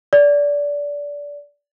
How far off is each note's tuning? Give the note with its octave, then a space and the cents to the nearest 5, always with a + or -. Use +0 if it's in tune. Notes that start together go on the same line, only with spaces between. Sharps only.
D5 -20